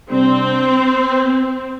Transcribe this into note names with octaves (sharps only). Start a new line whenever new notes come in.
C3 G3 C4 D4